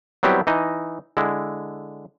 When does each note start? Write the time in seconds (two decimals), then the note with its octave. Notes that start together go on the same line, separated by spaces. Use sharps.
0.23 F#3 G3 B3 C4 E4 G4
0.47 E3 D#4 D#5
1.17 D3 G#3 E4